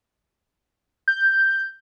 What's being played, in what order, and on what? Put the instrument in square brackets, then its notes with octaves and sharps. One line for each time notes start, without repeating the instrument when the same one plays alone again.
[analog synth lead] G6